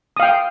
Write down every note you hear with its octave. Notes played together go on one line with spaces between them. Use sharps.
F5 G5 D#6